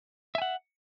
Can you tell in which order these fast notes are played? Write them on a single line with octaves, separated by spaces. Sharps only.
E5 G#5 F#5